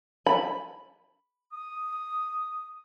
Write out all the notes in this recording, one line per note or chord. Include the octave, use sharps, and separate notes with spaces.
B5
D#6